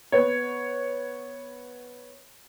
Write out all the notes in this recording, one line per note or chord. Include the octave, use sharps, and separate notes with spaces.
B3 C#5